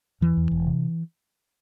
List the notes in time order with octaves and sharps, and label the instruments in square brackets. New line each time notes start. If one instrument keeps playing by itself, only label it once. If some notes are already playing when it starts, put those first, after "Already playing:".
[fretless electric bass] E2 E3
E2
E1
C3